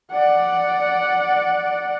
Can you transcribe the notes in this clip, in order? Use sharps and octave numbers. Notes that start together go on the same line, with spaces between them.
D5 F#5